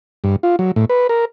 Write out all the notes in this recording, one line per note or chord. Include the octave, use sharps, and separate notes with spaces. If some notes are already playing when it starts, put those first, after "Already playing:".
G2
F4
F#3
A2
B4
A#4